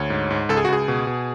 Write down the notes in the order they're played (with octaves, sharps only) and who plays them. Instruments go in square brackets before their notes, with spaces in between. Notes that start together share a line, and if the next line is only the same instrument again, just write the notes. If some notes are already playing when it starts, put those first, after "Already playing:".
Already playing: [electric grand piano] D2 C#5
G#2
G#2
C#2 A4
G#4
F#4
C#2 G#4
B2
B2